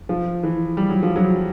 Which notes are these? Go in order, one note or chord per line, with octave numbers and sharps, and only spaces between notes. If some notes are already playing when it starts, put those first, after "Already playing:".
F3
E3
G3
F#3
F3
F#3